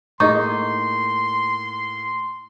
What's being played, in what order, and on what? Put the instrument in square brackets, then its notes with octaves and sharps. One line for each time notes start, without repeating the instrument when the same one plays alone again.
[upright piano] A2 A#3 [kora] D#4 [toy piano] G#4 D#5 C#6 [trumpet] C6